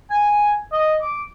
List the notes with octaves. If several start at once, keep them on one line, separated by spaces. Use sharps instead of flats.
G#5
D#5
D6